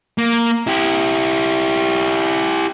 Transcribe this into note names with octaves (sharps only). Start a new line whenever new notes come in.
A#3
E4 G4